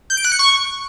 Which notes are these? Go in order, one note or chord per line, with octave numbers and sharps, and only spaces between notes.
G6
D7
F#6
C#7
C#6